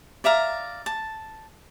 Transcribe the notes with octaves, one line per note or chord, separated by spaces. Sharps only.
D5 E5 F5 A#5
A5